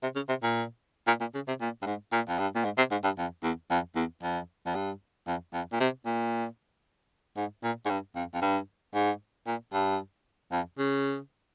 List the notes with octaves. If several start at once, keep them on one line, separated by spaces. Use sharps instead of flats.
C3
C#3
C3
A#2
A#2
A#2
C#3
C3
A#2
G2
G#2
A#2
F2
G2
A#2
G#2
C3
G#2
G2
F2
E2
F2
E2
F2
F2
G2
F2
F2
A#2
C3
A#2
G#2
A#2
G#2
G2
F2
F2
G2
G#2
A#2
G2
F2
C#3